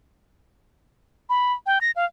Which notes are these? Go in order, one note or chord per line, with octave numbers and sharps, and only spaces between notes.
B5
G5
A#6
F5